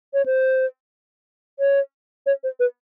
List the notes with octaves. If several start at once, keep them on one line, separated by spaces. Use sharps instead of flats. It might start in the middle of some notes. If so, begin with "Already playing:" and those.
C#5
C5
C#5
C#5
C5
B4